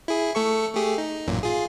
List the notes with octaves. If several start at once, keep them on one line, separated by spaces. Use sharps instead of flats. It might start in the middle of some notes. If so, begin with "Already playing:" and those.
E4 G#4
A3 A4 C#6
A3 G4 G#4
D#4
A1 F#2 A#2
F4 G#4